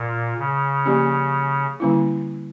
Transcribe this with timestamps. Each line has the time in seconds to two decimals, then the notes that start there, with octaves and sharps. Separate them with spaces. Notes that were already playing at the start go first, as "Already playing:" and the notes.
Already playing: A#2
0.38 C#3
0.85 F3 A#3 C#4 G4
1.80 D3 G3 A#3 C#4 E4